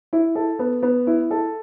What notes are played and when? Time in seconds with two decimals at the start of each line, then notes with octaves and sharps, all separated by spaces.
0.13 E4
0.35 A4
0.59 B3
0.83 B3
1.07 E4
1.31 A4